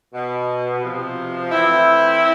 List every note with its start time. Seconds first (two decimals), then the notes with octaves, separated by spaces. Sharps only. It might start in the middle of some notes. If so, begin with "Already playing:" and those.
0.14 B2
0.82 C3 F3
1.51 A2 E3 C4 E4